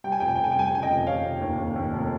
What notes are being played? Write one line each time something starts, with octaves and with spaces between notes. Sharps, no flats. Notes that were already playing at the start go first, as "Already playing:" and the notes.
G3 G5
G#5
F1 G5
G#5
G5
F1 G#5
G5
G3 G#5
G5
C#3 G#5
D#5 G5
F1
F1 C#5 F5
F1
D#2
D#2
D#2
F1